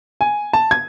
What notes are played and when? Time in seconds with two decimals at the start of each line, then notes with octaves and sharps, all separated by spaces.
0.21 G#5
0.53 A5
0.71 G#6